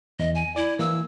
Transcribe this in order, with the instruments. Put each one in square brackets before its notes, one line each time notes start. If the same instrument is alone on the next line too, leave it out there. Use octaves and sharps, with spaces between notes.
[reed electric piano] E2 [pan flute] D#5
[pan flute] G#5
[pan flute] E4 [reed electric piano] D5
[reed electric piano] E3 A#3 [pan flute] E6